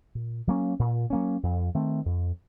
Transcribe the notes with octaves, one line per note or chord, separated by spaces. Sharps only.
A#2
F#3 A#3 C#4
A#2
F#3 A#3 C#4
F2
D#3 A3 C4
F2